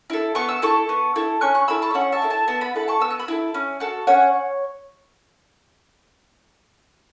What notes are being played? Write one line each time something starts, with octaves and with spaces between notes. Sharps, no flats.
E4 A4
B3 C#6
E6
E4 A4 A5 C#6
B3
E4 A4
C#4 C#6 F#6
C#6 F#6
E4 A4 B5 E6
A5 C#6
E5
C#4 C#5 F#5
E5 A5
E4 A4
E5 A5
B3 E5 A5
F#5 B5
E4 A4 F#5 B5
A5 C#6
B3 E6
F#6
B5 E6
E4 A4
C#4
F#4 A4
C#4 C#5 F#5